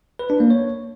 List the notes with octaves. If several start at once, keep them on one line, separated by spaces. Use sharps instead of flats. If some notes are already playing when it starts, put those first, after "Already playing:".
B4
D4
A#3
C#5